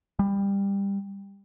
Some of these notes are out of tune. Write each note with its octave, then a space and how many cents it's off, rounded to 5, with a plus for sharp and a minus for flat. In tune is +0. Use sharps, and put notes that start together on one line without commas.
G3 +20